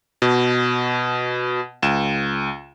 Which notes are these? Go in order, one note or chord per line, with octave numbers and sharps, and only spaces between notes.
B2
C#2 E7